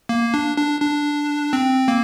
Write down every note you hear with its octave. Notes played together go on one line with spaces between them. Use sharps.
A#3
D4
D4
D4
C4
A#3